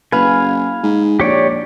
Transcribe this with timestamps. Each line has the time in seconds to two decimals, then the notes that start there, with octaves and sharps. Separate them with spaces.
0.12 F#1 B4 F5 G#5
0.83 G#2
1.20 A#1 G4 C#5 D5